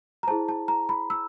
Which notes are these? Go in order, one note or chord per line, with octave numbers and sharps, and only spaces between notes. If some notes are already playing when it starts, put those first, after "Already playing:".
A#5
E4 G#4 C5 A5
A5
A#5
B5
E6